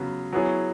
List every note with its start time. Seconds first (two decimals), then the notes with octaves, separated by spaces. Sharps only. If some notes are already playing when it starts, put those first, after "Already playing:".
Already playing: C#3 F#3 B3
0.33 F#3 B3 E4 G#4 C#5